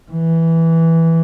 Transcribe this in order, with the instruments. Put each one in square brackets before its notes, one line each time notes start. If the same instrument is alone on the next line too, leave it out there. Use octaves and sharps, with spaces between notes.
[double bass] E3